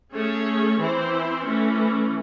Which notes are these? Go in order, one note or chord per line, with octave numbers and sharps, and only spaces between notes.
A3 C#4 G#4 C#5
E3 C4 E4 C5
E3 A3 C#4